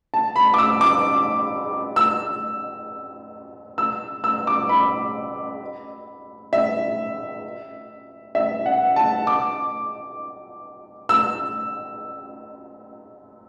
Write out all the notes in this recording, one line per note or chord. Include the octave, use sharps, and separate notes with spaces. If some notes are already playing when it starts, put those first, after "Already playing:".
A5
B5
D6
E6
D6
E6
E6
E6
D6
B5
E5
E5
F#5
A5
D6
E6